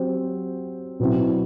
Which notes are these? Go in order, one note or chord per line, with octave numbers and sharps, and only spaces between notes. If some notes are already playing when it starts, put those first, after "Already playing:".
Already playing: F#3 C4 G4 C5
B2 F#3 C4 E4